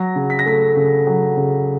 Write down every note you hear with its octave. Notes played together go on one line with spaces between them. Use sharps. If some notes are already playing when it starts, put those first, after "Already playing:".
Already playing: F#3 A#6
C#3
B6
A#6
A3 B6
C#3
F#3
C#3